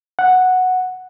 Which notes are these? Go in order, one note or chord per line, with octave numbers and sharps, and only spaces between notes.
F#5